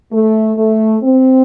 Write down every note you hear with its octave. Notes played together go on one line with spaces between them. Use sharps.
A3
A3
C4